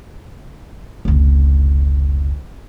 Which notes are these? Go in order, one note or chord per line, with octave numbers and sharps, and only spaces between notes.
F1 C#2